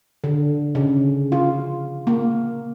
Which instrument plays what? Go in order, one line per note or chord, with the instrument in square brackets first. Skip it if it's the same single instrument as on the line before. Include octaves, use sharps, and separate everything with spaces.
[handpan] D3
C#3
F4
A#3